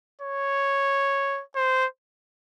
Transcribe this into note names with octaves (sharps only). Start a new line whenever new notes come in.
C#5
C5